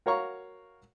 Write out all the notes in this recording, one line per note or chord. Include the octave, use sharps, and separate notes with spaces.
F#4 A#4 C#5 F5 A#5 C#6